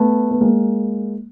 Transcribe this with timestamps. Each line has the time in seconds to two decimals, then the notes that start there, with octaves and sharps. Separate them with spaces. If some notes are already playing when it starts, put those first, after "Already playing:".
Already playing: A3 B3
0.31 B3
0.41 G#3 A#3